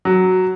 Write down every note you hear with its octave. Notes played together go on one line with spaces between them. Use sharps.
F#3